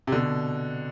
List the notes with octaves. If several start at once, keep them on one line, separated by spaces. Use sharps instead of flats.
C3
B2 D3